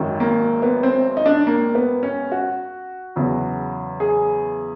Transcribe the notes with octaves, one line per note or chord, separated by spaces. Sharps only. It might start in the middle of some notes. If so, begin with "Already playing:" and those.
Already playing: G#1 F#2 D#3
A#3
B3
C4
D#4
D4
A#3
B3
C#4
F#4
E2 C#3 F#3
G#4